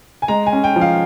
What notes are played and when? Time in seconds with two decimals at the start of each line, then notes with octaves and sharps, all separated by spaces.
0.22 G#5
0.28 G#3 A#5
0.46 G#5
0.52 C#4
0.64 G5
0.76 F3
0.81 F5